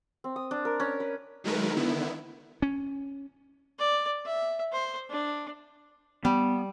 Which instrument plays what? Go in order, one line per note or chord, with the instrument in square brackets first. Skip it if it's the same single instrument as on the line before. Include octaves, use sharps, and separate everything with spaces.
[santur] C4
D#6
D4
A#4
C#4
B4
[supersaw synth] D#3 F#3 G#3 A3 A#4 B4
D3 D#3 B3 E4
[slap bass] C#4
[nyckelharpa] D5
E5
C5
D4
[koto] G3 [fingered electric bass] B3